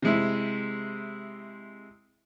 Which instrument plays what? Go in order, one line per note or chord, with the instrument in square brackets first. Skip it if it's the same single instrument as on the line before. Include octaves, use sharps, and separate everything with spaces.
[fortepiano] C3 G#3 E4